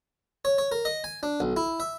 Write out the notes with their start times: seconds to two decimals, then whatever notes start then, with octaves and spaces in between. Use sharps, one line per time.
0.45 C#5
0.58 C#5
0.72 A#4
0.85 D#5
1.04 G#5
1.23 D4
1.40 B1
1.57 E4
1.80 E5